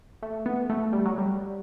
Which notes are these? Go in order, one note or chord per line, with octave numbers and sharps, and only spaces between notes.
A3
B3
A3
G3
F#3
G3